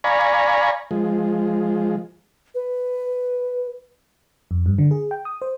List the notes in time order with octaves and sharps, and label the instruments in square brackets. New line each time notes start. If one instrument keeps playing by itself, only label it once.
[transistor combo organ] D5 F5 G#5 A#5 B5 C#6
F3 G#3
[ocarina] B4
[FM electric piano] F2
G2
D3
G#4
G5
D#6
C5